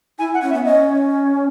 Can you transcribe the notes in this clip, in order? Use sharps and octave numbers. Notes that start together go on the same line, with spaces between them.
E4 G#5
F#5
C#4
E5
B3
C#4 D#5